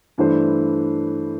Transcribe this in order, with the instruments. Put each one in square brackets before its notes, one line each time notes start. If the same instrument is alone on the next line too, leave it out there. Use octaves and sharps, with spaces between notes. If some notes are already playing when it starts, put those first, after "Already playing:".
[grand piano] G2 E3 A3 D4 C5